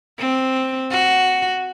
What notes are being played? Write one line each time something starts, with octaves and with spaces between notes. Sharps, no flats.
C4
F#4